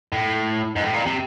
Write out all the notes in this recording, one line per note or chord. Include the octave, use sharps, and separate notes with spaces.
A2
G#2
A2
A#2
C3